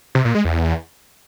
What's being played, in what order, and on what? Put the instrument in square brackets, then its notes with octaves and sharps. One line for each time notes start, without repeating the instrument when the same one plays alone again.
[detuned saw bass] C3
A#2
G#3
E2